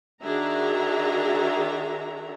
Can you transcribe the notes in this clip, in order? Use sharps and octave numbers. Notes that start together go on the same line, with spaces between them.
D#3 D4 F#4 G#4 E5 A#5